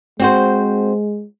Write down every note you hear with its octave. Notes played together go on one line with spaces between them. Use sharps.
G#3 C4 F#4 C5